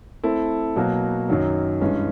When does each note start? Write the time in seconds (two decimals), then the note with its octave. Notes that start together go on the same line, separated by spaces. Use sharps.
0.24 A3 C4 E4 A4
0.76 B2 F#3 A#3
1.29 F#2 D#3 F#3
1.81 G2 E3 G#3 C#4